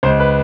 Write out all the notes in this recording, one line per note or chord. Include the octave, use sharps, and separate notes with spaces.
C#2 C5
B4